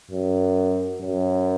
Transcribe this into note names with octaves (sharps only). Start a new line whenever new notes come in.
F#2
F#2